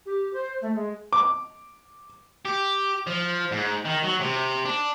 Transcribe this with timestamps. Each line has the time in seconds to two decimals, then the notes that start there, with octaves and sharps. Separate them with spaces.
0.05 G4
0.32 C5
0.61 A3
0.74 G#3
1.13 D6
2.45 G4
3.07 F3
3.52 G#2
3.85 D#3
4.03 F#3
4.21 C3
4.65 D4